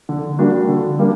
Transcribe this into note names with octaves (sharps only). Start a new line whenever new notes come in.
D3
G3 A#3 D4 F#4
D3
G3 A#3 D4